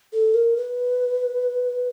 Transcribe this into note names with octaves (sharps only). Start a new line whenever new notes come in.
A4
A#4
B4